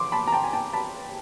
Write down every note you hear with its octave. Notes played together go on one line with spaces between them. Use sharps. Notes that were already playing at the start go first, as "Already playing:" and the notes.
Already playing: C#3 C6 D6
A5 B5
A#5
G5 A5
G#5
G5 A5
A5 B5